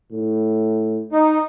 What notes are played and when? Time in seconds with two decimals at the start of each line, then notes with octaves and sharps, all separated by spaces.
0.12 A2
1.12 D#4